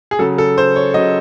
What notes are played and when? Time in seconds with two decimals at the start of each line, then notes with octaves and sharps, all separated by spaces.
0.11 G#4
0.19 C#3 F#3 A4
0.38 A4
0.58 C5
0.76 C#5
0.94 C#3 F#3 D#5